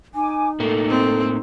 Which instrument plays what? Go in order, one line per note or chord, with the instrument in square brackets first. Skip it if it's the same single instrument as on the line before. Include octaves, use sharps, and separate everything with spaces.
[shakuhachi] D#4 [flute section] G#5 D6
[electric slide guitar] A2 A3 A#3 [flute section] A4
[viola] C4